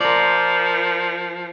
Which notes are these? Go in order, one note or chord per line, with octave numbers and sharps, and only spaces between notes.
F3 A#4 D5